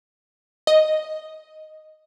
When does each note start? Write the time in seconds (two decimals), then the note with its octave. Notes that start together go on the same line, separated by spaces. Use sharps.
0.67 D#5